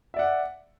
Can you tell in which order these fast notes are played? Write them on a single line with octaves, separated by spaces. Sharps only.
E5 D5 F#5